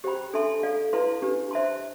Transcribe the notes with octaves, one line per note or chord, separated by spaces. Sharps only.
G4 C5 G5 B5
D4 A4 E5 A5 C6
A4 D5 F5
E4 B4 F5 A5 C6
D4 G4 B4
C5 E5 A5 C6